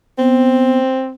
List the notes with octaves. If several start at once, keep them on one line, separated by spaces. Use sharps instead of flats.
B3 C4